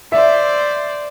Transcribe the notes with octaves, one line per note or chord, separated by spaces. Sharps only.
C5 D5 E5